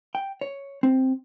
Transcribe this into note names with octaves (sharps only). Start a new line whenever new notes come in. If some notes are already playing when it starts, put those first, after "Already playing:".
G5
C#5
C4